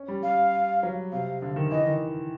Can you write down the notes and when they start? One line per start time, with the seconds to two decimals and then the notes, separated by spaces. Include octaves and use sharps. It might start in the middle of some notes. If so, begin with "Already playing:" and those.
Already playing: C#4
0.08 G3
0.23 G3 F5
0.83 F#3
1.12 C3 F5
1.42 D3
1.56 D#3
1.71 E3 D#5
1.87 D#3